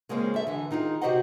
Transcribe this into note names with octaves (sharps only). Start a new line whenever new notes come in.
C#3 G#3 A#3 C4 C#4 G#4
A4 E5
D3 E3
D#3 D#4 F4 G#4
C3 F#4 G4 C5 D#5 F#5